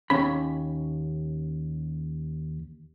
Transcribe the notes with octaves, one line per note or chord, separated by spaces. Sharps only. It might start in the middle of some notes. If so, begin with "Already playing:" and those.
D#2 C#4 B5